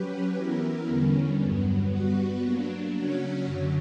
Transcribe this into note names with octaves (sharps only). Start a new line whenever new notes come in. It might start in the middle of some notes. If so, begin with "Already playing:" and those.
Already playing: F#3 C#4 G4 B4
E3 B3 E4 A#4
E2 D3 G3 C#4
G2 F#3 B3
G3 B3 F#4 B4
F#3 A#3 D4
C#3 F#3 C#4 F#4 C#5
F#2 D3 F#3